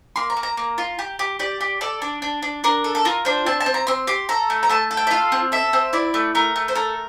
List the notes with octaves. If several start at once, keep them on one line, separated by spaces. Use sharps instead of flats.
A#3 C6
A#5
A#3
A#5
A#3
F4
G4
G4
G4 D5
G4
A4 D5
D4
D4
D4
D4 A#4
A4
A4
F4 A#4
D4 C5
C4 A5
A5
C4
A#5
C4 C6
G4 C6
A4 A#5
A3
A#5
A3 A5
A4
G5
E5
F4 F5
C4
A4 E5
C4
E4 D5
A3
A3 A#4
A3
C5
A4 A#4